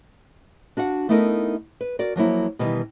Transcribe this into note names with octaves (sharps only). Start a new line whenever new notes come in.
D4 F#4 F5 F#5
A3 B3 D#4 E4 A4 A#4
B4
F#4 A#4 D5
F3 F#3 A#3 E4
B2 D#3 E3 G3